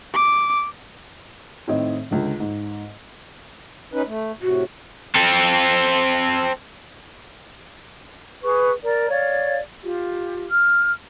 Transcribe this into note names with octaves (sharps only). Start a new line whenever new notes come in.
D6
A2 D#3 C4 D#5
C#2 D3
G#2
C#4 D#4 B4
A3
A2 C3 F#4
C4 A4
G#4 B4 C#6
A#4 D5
C#5 D5 F5
F4 G4
F6